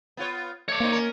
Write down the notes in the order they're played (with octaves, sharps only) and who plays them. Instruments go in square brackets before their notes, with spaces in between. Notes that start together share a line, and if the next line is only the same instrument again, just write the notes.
[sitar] B3 F4 C#5
[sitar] A3 [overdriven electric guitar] C#5 D5
[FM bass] A#3 [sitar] C4 D#4
[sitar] C#4 A#4